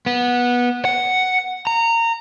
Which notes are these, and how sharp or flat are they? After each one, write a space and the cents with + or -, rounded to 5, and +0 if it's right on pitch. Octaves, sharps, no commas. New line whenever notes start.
B3 -15
F#5 +5
A#5 -20